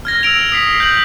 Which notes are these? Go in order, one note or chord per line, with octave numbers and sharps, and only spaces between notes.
F6 G#6 A#6
E6 A#6 D7 F7
D#6 B6 C7
G6 B6 F#7